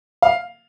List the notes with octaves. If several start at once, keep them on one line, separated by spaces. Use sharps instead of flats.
F5